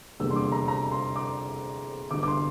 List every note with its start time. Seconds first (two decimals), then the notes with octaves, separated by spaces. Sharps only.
0.20 F1 E2 D3 G3 A#3 E6
0.31 C6
0.36 D6
0.52 A#5
0.68 A#5
0.92 C6
1.16 D6
2.11 G1 G2 D3 D6
2.23 D6
2.28 C6